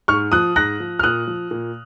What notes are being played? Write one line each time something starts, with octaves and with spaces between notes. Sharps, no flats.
G#2 C#6 F6
F3 D#6 F#6
G#2 F#6 A#6
F3
F6
A#2 D#6 F#6
F3
A#2